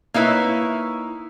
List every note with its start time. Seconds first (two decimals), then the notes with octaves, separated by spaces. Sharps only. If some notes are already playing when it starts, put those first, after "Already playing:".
0.14 A#3 D#4 E4 B4 C#5